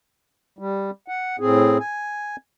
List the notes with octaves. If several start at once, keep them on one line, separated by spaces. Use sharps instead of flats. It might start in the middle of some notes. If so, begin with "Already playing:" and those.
G3
F#5
A2 C4 G#4
G#5